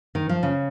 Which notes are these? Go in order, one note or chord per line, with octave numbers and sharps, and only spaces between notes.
D#3
F3
C#3